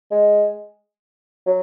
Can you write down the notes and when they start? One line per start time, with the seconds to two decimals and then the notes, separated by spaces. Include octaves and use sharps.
0.11 G#3
1.46 F#3